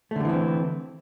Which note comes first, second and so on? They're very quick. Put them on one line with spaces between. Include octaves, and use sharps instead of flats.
A3 D3 G3 E3 C4